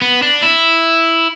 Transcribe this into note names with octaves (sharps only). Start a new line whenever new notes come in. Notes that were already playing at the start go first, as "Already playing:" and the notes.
B3
D4
E4